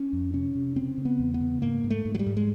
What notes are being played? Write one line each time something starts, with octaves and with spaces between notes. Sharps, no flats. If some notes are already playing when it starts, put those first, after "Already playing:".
Already playing: C#4
F2
C3 C#4
C3
C#3 C4
C#3
B3
E2
B3
C#3
G#2 A#3
G#2
A3
G#2
F#3
G3
G#2
G#3